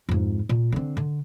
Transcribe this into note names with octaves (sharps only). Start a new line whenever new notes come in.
F2 G#2
A#2
D3 C4
D3